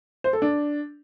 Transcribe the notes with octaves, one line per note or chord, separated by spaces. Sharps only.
C5
A4
D4